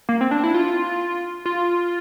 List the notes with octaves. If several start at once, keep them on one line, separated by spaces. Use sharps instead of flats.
A#3
C4
D4
E4
F4
F4